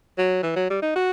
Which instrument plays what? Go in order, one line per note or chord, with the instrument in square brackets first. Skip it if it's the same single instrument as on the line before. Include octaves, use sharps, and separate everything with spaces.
[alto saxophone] F#3
E3
F#3
G3
D#4
F#4